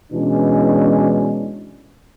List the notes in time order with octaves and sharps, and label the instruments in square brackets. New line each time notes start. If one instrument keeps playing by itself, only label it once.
[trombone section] B2 E3 G#3 C#4 D4